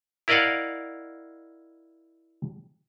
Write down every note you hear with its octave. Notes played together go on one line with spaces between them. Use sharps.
E4 A#4 D5 D#5 F5 F#5